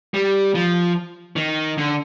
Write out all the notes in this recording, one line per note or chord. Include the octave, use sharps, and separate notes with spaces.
G3
F3
D#3
D3